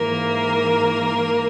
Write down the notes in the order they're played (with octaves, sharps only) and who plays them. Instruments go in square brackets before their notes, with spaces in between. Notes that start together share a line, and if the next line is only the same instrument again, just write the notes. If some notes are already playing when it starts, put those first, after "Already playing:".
Already playing: [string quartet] G#2 E3 A#3 A#4